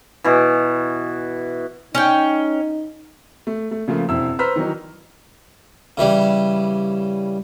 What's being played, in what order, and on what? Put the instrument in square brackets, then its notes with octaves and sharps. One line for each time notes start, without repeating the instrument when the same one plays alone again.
[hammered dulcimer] B2 E3
[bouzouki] C#4 C#5 G5 [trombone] D#4
[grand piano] A3
A3
C#3 F3 A3 A#3
E1 C4 E4 E6
B4 C5 A#5 E6 F6 B6
D#3 E3 F#3 D#4
[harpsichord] C#3 E3 G3